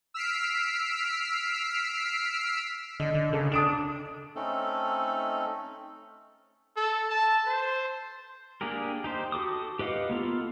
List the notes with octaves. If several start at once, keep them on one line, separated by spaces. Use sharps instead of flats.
E6 F6 B6 C7 D7
D3 D#5
D3
C#3 A4
D4 D#6 D7 E7
A3 C4 C#4 D#4 A4
A4
A5
C5
A#3 D4 G4 G#4 A#4
D#4 G4 C5
F#4 A4 D6 D#6
G4 B4 D#5 F5 F#5
A#3 B3 F4 A4